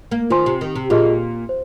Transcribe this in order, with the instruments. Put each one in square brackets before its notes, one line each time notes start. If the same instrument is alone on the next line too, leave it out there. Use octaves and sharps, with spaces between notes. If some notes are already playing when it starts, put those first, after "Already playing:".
[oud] A#3
[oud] D#3 [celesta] F4 C5 G#5 C6
[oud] C3
D#3
C3
[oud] A#2 [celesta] F4 G#4 D#5 C6
[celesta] C5